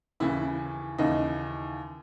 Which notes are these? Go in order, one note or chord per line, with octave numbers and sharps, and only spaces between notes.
D#2 C#3 E3 E4
D#2 C#3 E3 D#4